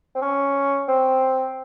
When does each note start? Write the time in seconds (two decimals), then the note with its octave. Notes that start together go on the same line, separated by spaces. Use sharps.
0.15 C4
0.22 C#4
0.88 C4